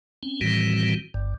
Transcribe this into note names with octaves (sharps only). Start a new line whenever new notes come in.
C4 C#4
A2 D#3 E3 G3 C4 F#4
G1 G2